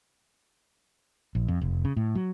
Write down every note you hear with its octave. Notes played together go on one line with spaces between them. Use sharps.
A#1
F2
F1
C#3
A2
F#3